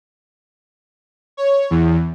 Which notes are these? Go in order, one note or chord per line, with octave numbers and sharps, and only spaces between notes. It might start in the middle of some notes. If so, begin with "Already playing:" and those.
C#5
E2